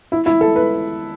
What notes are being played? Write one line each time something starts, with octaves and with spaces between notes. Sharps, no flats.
E4
E4
A4
B4